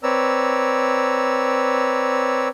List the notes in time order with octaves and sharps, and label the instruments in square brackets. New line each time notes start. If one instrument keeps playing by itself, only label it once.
[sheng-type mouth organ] C4 B4 C#5 D5 A#5 E6